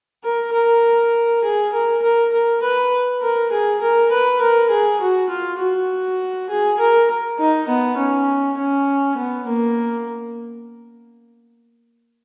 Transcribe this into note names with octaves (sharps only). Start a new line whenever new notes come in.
A#4
A#4
G#4
A#4
A#4
A#4
B4
A#4
G#4
A#4
B4
A#4
G#4
F#4
F4
F#4
G#4
A#4
D#4
B3
C#4
C#4
B3
A#3